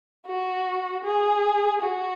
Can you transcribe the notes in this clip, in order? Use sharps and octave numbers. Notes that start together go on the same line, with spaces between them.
F#4
G#4
F#4